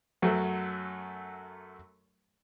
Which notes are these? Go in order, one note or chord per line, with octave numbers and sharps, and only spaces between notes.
F#2 F#3 A3 F#4